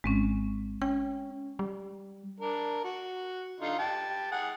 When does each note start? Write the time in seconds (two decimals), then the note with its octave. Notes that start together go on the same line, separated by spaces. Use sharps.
0.04 G#1 G#3 C4 C#4
0.82 C#4 G5
1.59 G3
2.40 D4 A#4
2.84 F#4
3.60 D3 D#4 F4
3.79 G4 A5
4.31 G#4 F#5